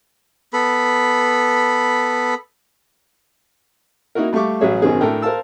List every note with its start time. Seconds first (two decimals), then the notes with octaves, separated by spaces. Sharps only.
0.53 B3 A4 B5
4.15 A#3 D#4 E4 F#4 A#4
4.33 G3 A3 F5 C#6 D6
4.61 A1 F#3 G#4 C#5 E5
4.82 G#1 F#2 B2 D#3 C4 G#4
5.01 A2 D4 A4 A#4 G5
5.22 A#4 C5 F5 A5 E6